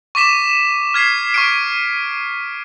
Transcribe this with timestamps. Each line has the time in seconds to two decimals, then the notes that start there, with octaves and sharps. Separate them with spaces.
0.15 C#6 D6 B6 E7
0.94 F6 G#6 B6 C7
1.34 C#6 F6 D7